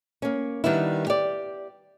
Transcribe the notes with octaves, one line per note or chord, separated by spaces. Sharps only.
A#3 C#4
D#3 G3 B3 D4 E4
G4 D5